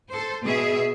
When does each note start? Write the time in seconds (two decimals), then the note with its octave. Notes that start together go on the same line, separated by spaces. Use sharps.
0.12 A4 C5
0.44 B2 G#4 E5